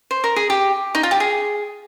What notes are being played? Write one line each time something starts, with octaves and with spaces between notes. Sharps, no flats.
C5
A#4
G#4
G4
D#4
F4
G4
G#4